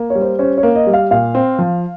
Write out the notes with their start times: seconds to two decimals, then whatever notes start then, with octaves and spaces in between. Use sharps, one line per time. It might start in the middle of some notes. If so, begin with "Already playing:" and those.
Already playing: A#3
0.10 C#5
0.15 G3
0.22 C5
0.39 C#4 C5
0.58 C#5
0.63 A#3
0.76 D#5
0.87 G3
0.93 F5
1.11 A#2 F5
1.35 C4
1.59 F3